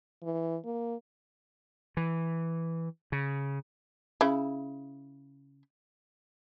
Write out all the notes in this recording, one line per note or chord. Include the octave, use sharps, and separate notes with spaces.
E3
A#3
E3
C#3
C#3 E4